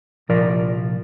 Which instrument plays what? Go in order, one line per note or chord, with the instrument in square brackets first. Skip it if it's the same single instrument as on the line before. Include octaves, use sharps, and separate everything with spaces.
[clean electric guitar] C2 A#2 F3 A#4 D5